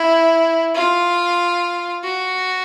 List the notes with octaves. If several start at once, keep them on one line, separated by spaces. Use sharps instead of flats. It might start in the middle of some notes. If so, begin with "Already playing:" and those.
Already playing: E4
F4
F#4